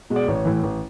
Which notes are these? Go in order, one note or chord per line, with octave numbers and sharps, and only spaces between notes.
B2 G#3
D5
A1 C#5
A2 E3
A1